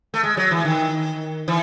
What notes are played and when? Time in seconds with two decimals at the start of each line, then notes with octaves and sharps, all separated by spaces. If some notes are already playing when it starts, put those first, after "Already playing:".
0.14 A3
0.23 G#3
0.37 F#3
0.51 E3
0.65 D#3
1.48 E3